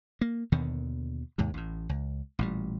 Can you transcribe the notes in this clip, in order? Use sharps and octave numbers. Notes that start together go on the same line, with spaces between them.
A#3
D#2 B2 D3 D#3
D#2 G#2 C3
A1 A2
C#2
A1 A#2 G3